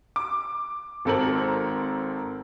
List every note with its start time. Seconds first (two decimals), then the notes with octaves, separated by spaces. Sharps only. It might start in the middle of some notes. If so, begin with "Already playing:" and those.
0.16 D6
1.05 G#1 C4 A4 A#4 C5 F#7